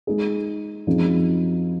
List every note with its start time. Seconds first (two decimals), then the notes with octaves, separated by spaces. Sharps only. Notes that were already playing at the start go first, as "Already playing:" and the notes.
0.07 G#3 D#4 G#4
0.87 F#2 F3 C4 D#4 G#4